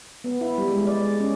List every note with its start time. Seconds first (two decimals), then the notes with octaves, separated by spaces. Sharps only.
0.24 B3
0.41 E4
0.58 G3
0.71 G#3
0.87 D5
1.00 G#3
1.20 C#4